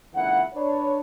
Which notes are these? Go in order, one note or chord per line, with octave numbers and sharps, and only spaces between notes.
C#2 D3 E3 A#3 F#5
D4 B4 C#5